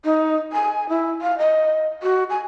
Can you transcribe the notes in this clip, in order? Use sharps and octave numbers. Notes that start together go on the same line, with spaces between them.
D#4
G#5
E4
F5
D#5
F#4
G#5